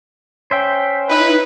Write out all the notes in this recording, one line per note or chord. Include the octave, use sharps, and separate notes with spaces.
C#4 C5 E5 G5
D#4 E4 B4